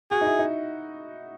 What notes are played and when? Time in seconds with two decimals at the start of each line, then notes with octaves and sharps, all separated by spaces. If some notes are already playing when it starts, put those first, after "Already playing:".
0.11 F#4 G#4
0.21 D#4
0.25 E4
0.39 D#4